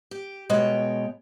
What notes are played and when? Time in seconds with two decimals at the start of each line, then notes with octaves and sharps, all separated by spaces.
0.11 G4
0.49 B2 G#3 B3 C#5 G5